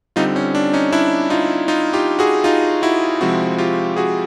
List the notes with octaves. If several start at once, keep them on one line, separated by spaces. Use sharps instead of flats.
D3 G3 C4 D#4 F4
C#4
D4
C#4 D#4
D4 E4
D#4 F4
D#4 F4
F4 G4
F#4 G#4
D#4 F4
E4 F#4
C3 F3 G#3 C4 E4 F#4
F4 G4
F#4 G#4